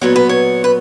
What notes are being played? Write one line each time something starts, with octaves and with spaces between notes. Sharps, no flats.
A#2 F#3 B3 C#5
B4
C#5
B4